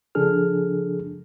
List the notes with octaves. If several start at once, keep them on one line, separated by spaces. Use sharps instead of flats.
C#3 F3 D4 G#4 A4 F6